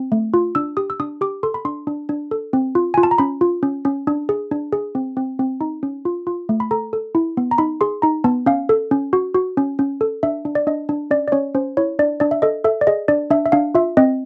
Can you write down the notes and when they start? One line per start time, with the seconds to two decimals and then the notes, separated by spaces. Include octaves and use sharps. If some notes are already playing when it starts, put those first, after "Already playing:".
Already playing: C4
0.12 A3
0.34 F4
0.55 D4 E6
0.77 G4 D#6
0.90 E6
1.00 D4 D#6
1.21 G4 D6
1.43 A4 C6
1.54 B5
1.65 D4 C6
1.87 D4
2.09 D4
2.31 A4
2.53 C4
2.75 F4
2.94 G#5
2.97 F4
3.03 A5
3.11 A#5
3.18 C#4 B5
3.41 F4
3.63 C#4
3.85 C#4
4.07 D4
4.29 G#4
4.51 D4
4.73 G#4
4.95 C4
5.17 C4
5.39 C4
5.61 D#4
5.83 C#4
6.05 F4
6.27 F4
6.49 A3
6.60 B5
6.71 A4 A#5
6.93 A4
7.15 E4
7.37 B3
7.51 A#5
7.58 D#4 B5
7.81 G#4 C6
8.02 D#4 A#5
8.24 B3 A5
8.46 C#4 F5
8.69 A4
8.91 C#4
9.13 F#4
9.35 F#4
9.57 C#4
9.79 C#4
10.01 A4
10.23 D4 E5
10.45 D4
10.55 D5
10.67 D4 D#5
10.89 D4
11.11 C#4 D5
11.28 D5
11.32 C#4 C#5
11.54 C#4 C5
11.77 E4 C#5
11.99 D4 D5
12.20 D4 D5
12.31 E5
12.42 A4 D#5
12.64 A4 E5
12.81 D5
12.87 G#4 D#5
13.08 D4 D5
13.30 D4 E5
13.46 E5
13.52 D4 F5
13.75 F4 E5
13.97 C4 D#5